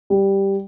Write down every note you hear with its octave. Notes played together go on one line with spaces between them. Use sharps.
G3